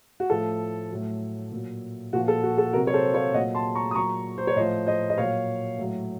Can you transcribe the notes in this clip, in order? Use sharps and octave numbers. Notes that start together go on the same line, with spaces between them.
F#4
A2 F3 A4
A2 F#3
A#2 F#3
A#2 F3 F#4
A4
F#4
A4
C3 F#3 F#4 A#4
C#5
A4 C5
C#5 F5
A#2 F#3 D#5 F#5
A5 C6
A#5 C#6
D#6
A#2 F#3 A#5 C#6
C5
C#5
A2 F3 C5 D#5
C5 D#5
D#5
A#2 F#3 C#5 F5
A2 F#3